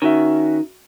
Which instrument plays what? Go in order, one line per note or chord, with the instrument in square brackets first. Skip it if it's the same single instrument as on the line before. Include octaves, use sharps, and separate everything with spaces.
[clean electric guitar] D#3 [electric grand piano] C#4 F#4 E5